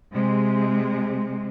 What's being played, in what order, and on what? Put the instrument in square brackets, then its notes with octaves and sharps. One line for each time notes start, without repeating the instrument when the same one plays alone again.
[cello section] C3 G#3